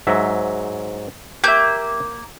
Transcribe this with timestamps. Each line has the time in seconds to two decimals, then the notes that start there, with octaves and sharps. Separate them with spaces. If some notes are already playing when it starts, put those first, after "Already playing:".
0.07 G#2 F#3 E5
1.44 A#3 G4 E5 G6